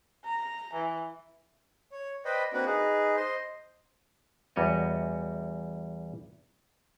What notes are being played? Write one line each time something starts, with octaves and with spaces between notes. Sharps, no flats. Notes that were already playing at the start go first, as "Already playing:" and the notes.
A#5
E3
C#5
B4 C5 D5 D#5 G5 B5
A#3 C4 D4 F#4 B4 F#5
D#4 G#4 B4
C5 D#5 C6
E2 G3 F#4 C#5 D#5